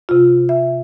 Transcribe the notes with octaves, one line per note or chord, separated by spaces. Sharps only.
C3 F4
E5